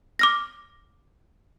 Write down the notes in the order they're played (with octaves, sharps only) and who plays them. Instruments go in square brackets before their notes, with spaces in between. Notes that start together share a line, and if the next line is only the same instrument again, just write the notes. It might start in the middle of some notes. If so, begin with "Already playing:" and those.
[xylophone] D6 F6 A#6